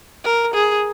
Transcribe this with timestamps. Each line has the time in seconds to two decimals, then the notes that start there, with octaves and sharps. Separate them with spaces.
0.24 A#4
0.54 G#4